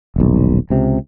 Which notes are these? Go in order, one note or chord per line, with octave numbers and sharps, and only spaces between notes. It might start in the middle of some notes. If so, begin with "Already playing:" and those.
D#1 B1
C#2 C3